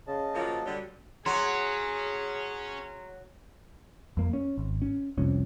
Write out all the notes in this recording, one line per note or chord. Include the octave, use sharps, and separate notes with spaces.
C#3 D#5 A5
F3 F#3 A#3
D3 F#3 G3
F#3 C#4 G#4 C6
F2 A#3
C#4
G#1
C#4
F1 C2 F2 C#4